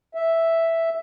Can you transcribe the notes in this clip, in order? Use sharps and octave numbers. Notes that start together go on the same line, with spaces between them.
E5